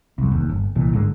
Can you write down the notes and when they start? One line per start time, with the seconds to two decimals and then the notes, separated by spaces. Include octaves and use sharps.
0.18 C2 F2
0.31 F1 D#2
0.49 G1
0.75 C2 A#2 E3
0.93 G1 G#2 D3 G#3